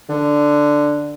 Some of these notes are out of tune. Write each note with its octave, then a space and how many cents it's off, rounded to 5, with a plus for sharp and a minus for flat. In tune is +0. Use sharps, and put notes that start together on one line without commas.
D3 +5